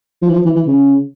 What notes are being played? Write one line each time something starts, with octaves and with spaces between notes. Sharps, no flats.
F3
E3
F3
E3
E3
C#3